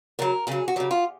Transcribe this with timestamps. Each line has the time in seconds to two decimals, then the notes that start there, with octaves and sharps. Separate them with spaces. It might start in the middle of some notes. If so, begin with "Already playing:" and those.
0.19 C#3 F#3 A#4
0.47 C#3 F#3 G#4
0.68 F#4
0.76 C#3 F#3 G4
0.91 F4